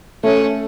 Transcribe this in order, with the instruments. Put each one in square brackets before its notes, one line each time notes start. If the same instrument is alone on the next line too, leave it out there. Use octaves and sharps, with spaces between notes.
[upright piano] A3 [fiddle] C#4